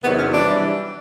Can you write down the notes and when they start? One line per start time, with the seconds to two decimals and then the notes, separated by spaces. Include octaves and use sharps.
0.02 E2 C3 D#3 F#3 B3
0.19 C#4
0.33 E3 G3 D4